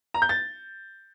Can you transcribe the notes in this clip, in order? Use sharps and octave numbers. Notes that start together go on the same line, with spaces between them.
A#5
G6
A6